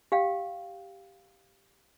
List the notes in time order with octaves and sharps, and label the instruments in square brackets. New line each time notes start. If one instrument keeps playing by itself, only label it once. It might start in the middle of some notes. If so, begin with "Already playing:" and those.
[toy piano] G4 F5 G5